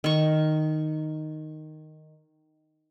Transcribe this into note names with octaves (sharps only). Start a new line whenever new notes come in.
D#3 C#6